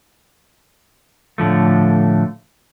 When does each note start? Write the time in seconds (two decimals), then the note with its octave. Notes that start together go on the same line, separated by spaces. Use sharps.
1.38 A2 D3 F3 A3